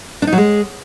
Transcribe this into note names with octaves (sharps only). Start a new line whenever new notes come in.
D4
D#4
F#3
G#3